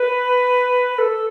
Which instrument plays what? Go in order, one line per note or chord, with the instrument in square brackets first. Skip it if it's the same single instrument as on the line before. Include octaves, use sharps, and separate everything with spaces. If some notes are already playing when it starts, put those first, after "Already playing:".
Already playing: [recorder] B4
B4
A4